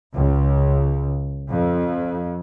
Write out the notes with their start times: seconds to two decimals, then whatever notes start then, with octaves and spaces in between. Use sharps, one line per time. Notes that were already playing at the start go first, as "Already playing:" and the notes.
0.15 C#2
1.50 F2